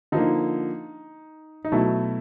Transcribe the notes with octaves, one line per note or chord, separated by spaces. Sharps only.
D3 F3 A#3 D#4
D#4
B2 F#3 A3 E4